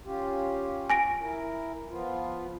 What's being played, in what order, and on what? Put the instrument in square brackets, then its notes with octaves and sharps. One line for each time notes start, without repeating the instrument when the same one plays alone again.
[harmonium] C#4 F4 G4
[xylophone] G#5 A#6 D7
[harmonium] E4 A#4
F3 B3 F4